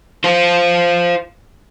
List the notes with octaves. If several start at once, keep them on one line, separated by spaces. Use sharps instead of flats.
F4 C5